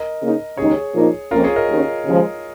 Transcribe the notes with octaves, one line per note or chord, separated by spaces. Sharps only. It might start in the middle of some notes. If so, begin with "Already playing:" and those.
Already playing: A#4 D#5
C#3 A#3 D#4
D#2 C#3 G#3 D#4 G#4 C#5
A#2 F3 A#3 D#4
F2 F3 A#3 C#4 F4 A#4
G#4 C#5
A#4 D#5
D#2 D#3 C#4
D#2 C#3 F3 G#3